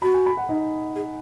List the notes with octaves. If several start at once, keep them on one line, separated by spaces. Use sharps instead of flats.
F#4 B5
G#5
B5
F#5
D#4
G#4